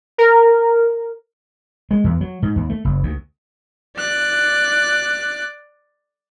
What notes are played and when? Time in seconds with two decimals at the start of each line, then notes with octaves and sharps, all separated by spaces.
0.18 A#4
1.91 G#3
2.04 E2
2.21 F#3
2.42 G#2
2.56 D#2
2.70 A3
2.85 F#1
3.03 D2
3.98 D5 F#6